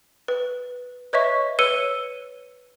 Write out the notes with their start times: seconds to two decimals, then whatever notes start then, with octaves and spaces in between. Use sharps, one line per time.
0.28 B4
1.13 B4 C#5 D#5 E5 C#6
1.59 B4 C#5 E6 C#7 D#7 G7